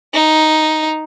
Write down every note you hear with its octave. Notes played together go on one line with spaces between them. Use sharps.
D#4